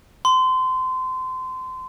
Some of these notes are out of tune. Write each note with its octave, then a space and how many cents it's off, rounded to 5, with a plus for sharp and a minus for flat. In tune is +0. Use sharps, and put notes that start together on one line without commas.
C6 -25